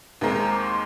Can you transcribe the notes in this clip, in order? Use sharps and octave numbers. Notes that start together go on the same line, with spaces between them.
D#2 D#3 G#3 C4 A#5
D6
C6